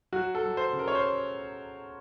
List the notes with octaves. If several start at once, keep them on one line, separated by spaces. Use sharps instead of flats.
F#3 F#4
A4
F#3
C5
C#3
A#4
C#5
C5